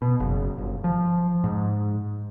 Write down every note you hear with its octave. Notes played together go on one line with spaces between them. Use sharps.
B2
F#1
G1
F3
G#2